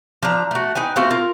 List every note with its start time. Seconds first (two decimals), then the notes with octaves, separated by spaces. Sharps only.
0.22 F3 D4 A#5
0.51 A3 F#4
0.75 D#4 B4 G5 G#5
0.96 A3 C4 F4 F#4
1.11 F4 A#4